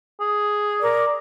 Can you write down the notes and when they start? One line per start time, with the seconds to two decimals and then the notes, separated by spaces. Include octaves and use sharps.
0.20 G#4
0.82 A#4 D5